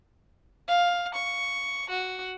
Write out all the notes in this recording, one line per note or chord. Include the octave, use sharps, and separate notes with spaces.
F5
C#6
F#4